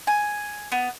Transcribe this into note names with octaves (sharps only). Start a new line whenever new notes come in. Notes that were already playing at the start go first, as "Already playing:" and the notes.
G#5
B3